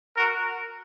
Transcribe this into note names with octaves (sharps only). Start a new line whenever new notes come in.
F#4 A#4